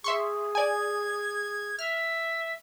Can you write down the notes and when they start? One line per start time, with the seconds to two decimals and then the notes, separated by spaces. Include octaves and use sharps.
0.04 G#4 E5 C6 C#6
0.55 D5 G#5 G#6
1.79 E5 F6